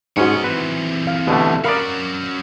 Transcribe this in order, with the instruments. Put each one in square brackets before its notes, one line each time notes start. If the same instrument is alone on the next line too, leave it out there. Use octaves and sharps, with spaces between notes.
[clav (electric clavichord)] G#2 C#4 [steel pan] D#4 F#4 [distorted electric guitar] C#5 D#5
[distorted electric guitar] E3 C4 [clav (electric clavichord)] B4
[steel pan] F5
[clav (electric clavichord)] B2 D3 A3 [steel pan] G4
[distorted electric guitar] C#4 F#4 [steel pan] A#4 B5 D#6 [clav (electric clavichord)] D5 F5